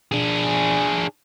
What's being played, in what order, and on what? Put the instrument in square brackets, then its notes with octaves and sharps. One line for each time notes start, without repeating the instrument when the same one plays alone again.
[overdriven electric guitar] D4 G#4